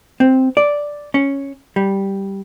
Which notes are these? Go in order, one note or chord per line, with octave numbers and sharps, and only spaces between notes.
C4
D5
C#4
G3